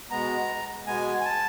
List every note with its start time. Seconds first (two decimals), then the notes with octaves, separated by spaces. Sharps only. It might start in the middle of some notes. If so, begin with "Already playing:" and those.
0.10 B2 G#3 B3 A#5
0.87 B2 G#3 B3 G#5
1.21 G#5
1.25 A5